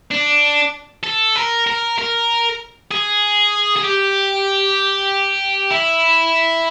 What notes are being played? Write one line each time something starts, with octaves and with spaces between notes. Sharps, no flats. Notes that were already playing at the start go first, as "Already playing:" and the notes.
D4
A4
A#4
A#4
A#4
G#4
G#4
G4
E4